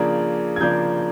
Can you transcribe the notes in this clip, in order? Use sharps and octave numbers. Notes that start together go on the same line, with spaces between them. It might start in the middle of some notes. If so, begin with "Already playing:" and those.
Already playing: C#3 F3 A#3 D4 G#6
G#6
C#3 F3 A#3 D4 G6